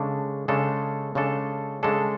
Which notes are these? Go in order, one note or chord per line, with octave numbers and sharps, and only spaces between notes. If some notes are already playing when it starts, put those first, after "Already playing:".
Already playing: C#3 G#3 D4 A4
C#3 G#3 D4 A4
C#3 G#3 D4 A4
C#3 G#3 D4 A4